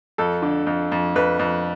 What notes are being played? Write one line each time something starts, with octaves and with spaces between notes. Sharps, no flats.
F2 A4
D3
F2
F2
F2 B4
F2